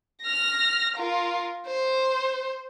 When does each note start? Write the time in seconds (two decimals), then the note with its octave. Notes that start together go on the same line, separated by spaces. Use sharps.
0.23 F6 A#6
0.96 F4 A#4
1.67 C5